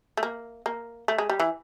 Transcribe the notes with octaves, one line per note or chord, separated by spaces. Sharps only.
A3
A#3
A#3
A3
G#3
G3
E3